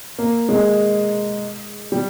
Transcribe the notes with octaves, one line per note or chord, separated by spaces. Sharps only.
A#3
G#3
G3